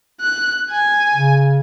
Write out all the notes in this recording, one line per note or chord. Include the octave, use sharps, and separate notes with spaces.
F#6
G#5
C#3